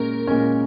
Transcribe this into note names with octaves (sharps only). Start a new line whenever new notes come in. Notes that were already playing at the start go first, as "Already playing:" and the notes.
Already playing: A#2 G#3 C#4 A#4
A#2 G#3 C#4